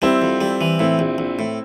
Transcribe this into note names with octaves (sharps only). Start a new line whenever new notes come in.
G3 C4 E4
F2
G3
E3
A2 C4 E4
A#1
A#1
A2